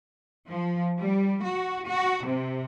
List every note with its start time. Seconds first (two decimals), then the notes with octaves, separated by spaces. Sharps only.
0.49 F3
1.00 G3
1.44 F#4
1.86 F#4
2.26 C3